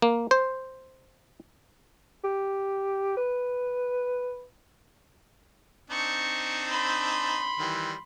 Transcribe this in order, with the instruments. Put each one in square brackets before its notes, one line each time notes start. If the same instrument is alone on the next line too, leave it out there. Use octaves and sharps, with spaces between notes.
[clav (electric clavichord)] A#3
C5
[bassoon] G4
B4
[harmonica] C4 D4 D#4 [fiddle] C#6
[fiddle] B5 C6
[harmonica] D#3 E3 G3